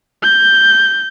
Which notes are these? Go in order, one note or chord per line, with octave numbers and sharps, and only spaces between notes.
G6